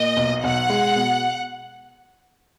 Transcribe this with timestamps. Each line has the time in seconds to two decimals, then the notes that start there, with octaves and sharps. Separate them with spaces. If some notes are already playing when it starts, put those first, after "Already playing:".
Already playing: A#2 D#5
0.17 B1
0.43 B1 F#5
0.69 G#3
0.96 B2